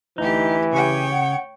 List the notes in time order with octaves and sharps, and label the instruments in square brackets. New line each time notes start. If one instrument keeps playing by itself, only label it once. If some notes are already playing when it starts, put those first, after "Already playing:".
[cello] D2 G4 [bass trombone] E3 [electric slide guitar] D#4
[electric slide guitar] C#3 [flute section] G4 G#5 [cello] C#5 G5
[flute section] F#5